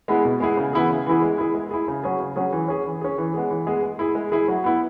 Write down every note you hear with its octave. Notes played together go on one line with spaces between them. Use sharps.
G#3 B3 E4 G#4
B2
G#3 B3 E4 G#4
C#3
E3 B3 E4 G#4
C#3
E3 B3 E4 G#4
G#3
E4 G#4
G#3
E4 G#4
C#3
F#3 C#4 G#4
C#3
F#3 C#4 G#4
E3
C#4 G#4
E3
C#4 G#4
E3
G#3 B3 G#4
E3
G#3 B3 G#4
G#3
E4 G#4
G#3
E4 G#4
F#3
B3 E4